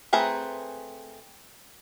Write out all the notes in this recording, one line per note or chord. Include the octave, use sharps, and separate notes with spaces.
A3 C4 G#4 B4 A#5